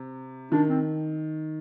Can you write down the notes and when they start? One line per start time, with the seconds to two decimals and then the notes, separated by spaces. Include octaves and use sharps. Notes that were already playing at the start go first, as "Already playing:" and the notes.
Already playing: C3
0.51 D#3 D4
0.69 C4